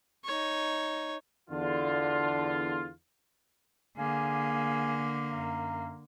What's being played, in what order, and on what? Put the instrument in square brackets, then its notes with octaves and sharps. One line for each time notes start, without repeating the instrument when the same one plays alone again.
[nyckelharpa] D#4 C#5
[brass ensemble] E2 D3 F4
[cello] D3 A#3 [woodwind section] G#4 F5 G#5
[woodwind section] F#2 F5 A#5